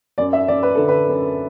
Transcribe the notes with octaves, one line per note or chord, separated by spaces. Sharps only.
F#2 D5
E5
F#2 D5
B4
D3 A4
B4
F#2